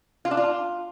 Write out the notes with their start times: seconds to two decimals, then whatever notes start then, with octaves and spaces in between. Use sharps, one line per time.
0.25 F4
0.31 D4
0.37 F4